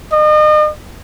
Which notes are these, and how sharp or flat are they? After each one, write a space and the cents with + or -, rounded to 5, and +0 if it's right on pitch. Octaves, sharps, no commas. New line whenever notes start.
D#5 -40